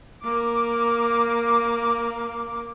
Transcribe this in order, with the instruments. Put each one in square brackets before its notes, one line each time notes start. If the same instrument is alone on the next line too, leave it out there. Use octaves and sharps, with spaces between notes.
[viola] A#3 D6